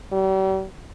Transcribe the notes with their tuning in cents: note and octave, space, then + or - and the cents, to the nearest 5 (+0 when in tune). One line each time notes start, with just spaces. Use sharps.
G3 -40